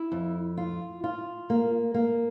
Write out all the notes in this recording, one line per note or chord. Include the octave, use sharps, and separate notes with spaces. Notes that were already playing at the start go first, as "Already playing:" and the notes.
Already playing: E4
F2
F4
F4
A#3
A#3